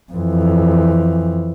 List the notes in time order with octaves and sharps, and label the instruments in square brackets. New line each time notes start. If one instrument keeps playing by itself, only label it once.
[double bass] F2 E3